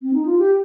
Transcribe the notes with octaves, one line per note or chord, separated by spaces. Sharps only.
C4
D#4
F4
G4